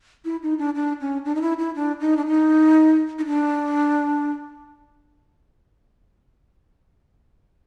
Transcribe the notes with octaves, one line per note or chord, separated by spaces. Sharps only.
E4
D#4
D4
D4
C#4
D4
D#4
E4
E4
D4
D#4
D4
D#4
D#4
D4